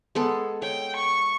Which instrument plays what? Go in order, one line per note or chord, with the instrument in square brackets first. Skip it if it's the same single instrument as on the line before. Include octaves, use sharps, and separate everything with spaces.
[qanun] G#3 B3 A4
[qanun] C#5 [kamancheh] G5
[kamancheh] C#6